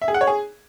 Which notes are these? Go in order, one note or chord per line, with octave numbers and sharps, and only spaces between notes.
E5
G#4
F#5
C#5
G#4